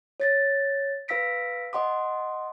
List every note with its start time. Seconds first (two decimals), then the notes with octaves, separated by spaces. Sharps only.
0.20 C#5 A6 A#6
1.08 B4 F5 E6 A#6 B6 D7
1.73 D#5 F#5 C6 D6